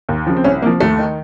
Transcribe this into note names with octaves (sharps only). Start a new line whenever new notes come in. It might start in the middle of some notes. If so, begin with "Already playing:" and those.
D#2
C#3 F3
C4
C2 C#4
C3 F3 A#3
D#2 A3
D#3